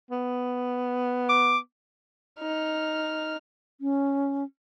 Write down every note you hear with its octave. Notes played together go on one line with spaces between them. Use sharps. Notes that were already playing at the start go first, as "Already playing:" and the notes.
B3
D6
D#4 F6
C#4